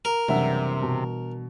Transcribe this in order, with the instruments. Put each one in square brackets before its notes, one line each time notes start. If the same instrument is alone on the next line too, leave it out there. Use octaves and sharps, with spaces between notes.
[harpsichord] A#4
[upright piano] F#1 E5 F#5 [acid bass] C3 [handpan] E3 G3 D4
[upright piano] B2